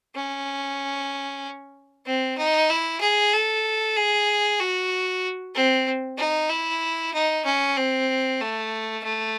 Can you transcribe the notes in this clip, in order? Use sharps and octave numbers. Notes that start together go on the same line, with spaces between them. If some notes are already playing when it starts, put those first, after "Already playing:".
C#4
C4
D#4
E4
G#4
A4
G#4
F#4
C4
D#4
E4
D#4
C#4
C4
A3
A3